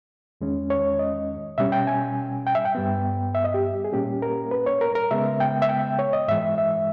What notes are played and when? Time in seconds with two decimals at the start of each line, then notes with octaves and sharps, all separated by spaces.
0.41 E2 D#3 G#3 C#4
0.70 C#5
0.99 D#5
1.58 B2 G3 C#4 E5
1.72 G5
1.87 G#5
2.47 G5
2.55 E5
2.65 G5
2.75 G2 G3 B3
3.35 E5
3.44 D#5
3.54 G4
3.85 G#4
3.93 A#2 G3 A#3 C#4 G4
4.22 A#4
4.51 B4
4.66 C#5
4.81 A#4
4.95 A#4
5.11 C#3 G#3 B3 E5
5.40 G5
5.62 E5
5.69 G5
5.99 C#5
6.13 D#5
6.28 G#2 E3 G#3 E5
6.58 E5